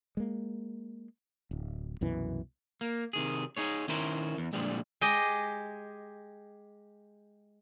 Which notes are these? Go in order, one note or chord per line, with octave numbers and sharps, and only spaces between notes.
G#3 A#3
D1
C2 F#2 B2 E3
A#3
C3 D#3 G#4
D#4 G#4 C#5
D#3 C#4 E4 A#4 C5
E2
A#2 D3 D#3 F3 G3 G#3
G#3 G4 G#4 D#5